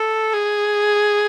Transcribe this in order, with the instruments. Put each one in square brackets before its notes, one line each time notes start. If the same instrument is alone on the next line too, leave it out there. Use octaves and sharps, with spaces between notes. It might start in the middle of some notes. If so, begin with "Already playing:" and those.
Already playing: [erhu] A4
G#4